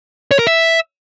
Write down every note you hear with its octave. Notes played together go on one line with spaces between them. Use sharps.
C#5
A#4
E5